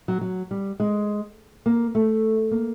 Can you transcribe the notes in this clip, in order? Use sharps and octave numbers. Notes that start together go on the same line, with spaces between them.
F#3
F#3
G3
G#3
A#3
A3
A#3